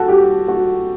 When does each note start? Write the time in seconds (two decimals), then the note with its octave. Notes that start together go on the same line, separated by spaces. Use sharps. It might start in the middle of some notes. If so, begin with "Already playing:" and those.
Already playing: F#4 A4
0.08 G4
0.48 F#4